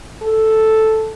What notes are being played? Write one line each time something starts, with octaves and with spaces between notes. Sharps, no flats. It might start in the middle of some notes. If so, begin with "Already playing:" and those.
A4